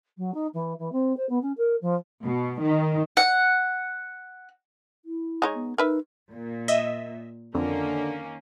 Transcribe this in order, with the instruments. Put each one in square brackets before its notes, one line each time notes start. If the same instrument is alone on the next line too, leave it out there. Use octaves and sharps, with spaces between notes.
[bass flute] F#3
D#4
E3
E3
C4
C5
B3
C#4
A#4
F3
[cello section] B2
D#3
[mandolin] F#5
[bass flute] E4
[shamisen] G#3 D#4 C#5
[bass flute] B3
[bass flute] D#4 [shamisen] A#4 B4 E5
[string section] A#2
[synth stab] D#5 E5
[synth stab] F2 [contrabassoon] D3 [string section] D#3 A#3 C#4